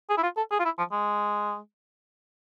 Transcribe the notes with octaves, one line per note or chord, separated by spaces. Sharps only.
G#4
E4
F4
A4
G#4
F4
E4
F3
G#3